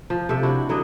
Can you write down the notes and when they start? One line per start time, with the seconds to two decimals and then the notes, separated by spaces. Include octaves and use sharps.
0.10 F3
0.29 C3 A4 E5
0.43 D4 E4 F#4
0.69 D3 F#3 D4 D#5